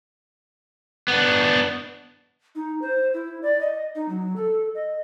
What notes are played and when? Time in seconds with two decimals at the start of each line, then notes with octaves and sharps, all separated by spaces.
1.08 B3 D4
2.55 D#4
2.82 C5
3.14 E4
3.42 D5
3.60 D#5
3.95 D#4
4.09 F#3
4.36 A4
4.75 D#5